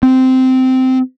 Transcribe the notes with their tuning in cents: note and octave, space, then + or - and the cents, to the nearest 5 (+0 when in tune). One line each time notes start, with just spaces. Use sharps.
C4 -15